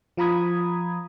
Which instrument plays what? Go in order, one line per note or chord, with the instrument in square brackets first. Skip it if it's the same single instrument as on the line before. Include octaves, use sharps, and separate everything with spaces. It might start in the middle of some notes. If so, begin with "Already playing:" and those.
[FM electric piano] F3 F4 A#5 B5 D#6 G#6